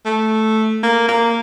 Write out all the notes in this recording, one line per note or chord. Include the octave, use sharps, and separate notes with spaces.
A3
A#3
A#3